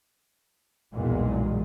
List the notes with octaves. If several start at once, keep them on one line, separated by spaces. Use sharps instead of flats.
B1 E2 G2 A#2 G#3